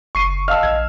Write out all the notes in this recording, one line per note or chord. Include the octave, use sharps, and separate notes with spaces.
F#1 C#6 C7 D#7
D#5 F5 A5 E6 F6
A#1 G#6